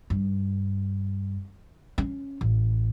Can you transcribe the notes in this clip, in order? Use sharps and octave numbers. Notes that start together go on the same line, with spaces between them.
G2
C#4
A1